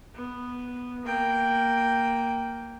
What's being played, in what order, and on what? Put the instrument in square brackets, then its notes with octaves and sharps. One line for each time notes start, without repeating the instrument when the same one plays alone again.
[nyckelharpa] B3
A#3 G5